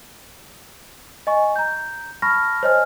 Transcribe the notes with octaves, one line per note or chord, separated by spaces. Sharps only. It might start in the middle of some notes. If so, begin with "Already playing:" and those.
D#5 G#5 C#6
A#5 G6
A5 B5 C#6 F6 A#6
C5 C#5 D#5 G#5 F6